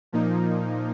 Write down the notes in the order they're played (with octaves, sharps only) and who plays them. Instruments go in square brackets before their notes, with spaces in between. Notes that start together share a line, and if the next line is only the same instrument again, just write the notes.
[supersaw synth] A#2 F3 A#3 D#4